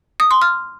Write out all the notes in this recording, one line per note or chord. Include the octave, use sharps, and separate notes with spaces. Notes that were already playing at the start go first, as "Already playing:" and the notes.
D#6
C6
F6